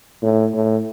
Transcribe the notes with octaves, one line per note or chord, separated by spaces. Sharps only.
A2
A2